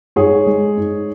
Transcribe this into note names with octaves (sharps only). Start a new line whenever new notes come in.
G#2 G#4 C#5
G#3
G#2